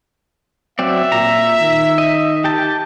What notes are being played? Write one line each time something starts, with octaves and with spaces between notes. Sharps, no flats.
F#3 C4 D5 E5
A#2 A#5
D#3
D#5
G4 G5 A5